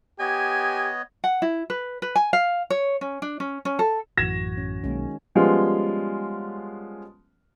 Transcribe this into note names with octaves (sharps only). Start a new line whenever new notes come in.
B3 G4 C#5 D#5 G#5
F#5
E4
B4
B4
G#5
F5
C#5
C#4
D4
C#4
C#4
A4
A1 F#2 E3 F#4 G#6 A#6 E7
C#4
B1 D#3 G#3 A#3 C#4
F3 G3 G#3 B3 C#4 F4